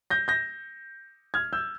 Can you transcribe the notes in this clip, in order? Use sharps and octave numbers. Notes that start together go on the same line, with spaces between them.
G6 A#6
G6 A#6
F6 G#6
E6 G6